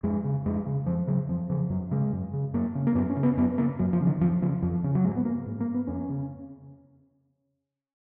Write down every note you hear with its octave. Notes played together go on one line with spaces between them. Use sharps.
F2 G#3
C#3
F2 G#3
C#3
F2 F3
C#3 F#3
F2 F3
C#3 F3
F#2 F#3
C#3 G#3
F#2
C#3
F#2 A#3
C#3
A#3
F#2 B3
C#4
C#3
B3
F#2 B3
C#3 A#3
F#2 F#3
F3
C#3
D#3
F2 F3
C#3 F3
F2 F3
C#3
F#3
G#2 G#3
B3
A#3
G#2
A#3
B3
F2 C#4
C#3